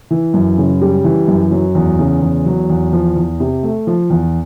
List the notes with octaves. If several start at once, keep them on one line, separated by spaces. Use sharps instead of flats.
E3
F#2
C#3
G3
E3
F#2
F#3
E2
C#3
E2
F#3
E2
F3
E2
C3
A3
F3
E2